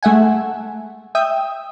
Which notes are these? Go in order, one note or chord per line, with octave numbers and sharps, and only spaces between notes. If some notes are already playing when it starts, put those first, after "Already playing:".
G#3 A3 E5 F#5 G#5
E5 G5 D#6